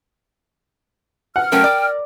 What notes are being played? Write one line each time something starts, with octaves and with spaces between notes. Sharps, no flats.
F#5 F6
F#3 A3 C#4 A#4 G5
D5